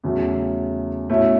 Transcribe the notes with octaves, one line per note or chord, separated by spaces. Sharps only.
E2 C#3 F#3 A3
B2 A3 C#4 E4